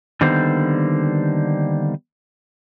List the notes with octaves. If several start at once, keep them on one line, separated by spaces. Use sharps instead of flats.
D3 D#3 G3 A#3 B3 C5